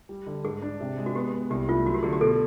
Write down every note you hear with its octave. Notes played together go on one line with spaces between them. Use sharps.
G3
D3
G#2 G#4
D4
C3
G#3
F#4
B3 G4
B3
C2 G4
A3 F4
F#3 F#4
G4
D3 G#4
G4
B2 A4